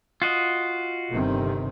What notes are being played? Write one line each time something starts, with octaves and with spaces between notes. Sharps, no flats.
F4 F#4 D#5
G1 C3 D#3